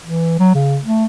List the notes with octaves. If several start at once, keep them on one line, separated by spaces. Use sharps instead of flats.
E3
F#3
C#3
A3